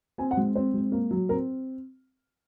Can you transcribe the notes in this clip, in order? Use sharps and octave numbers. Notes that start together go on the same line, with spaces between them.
C4 G#5
F#5
G#3
C4 C5
G#3
A#3
F#3
C4 A#4